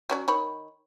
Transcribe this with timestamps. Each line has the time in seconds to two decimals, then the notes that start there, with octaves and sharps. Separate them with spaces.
0.10 F#3 C#4 D5
0.28 D#3 C#5 B5